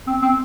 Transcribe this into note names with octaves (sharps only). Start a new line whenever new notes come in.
C4
C4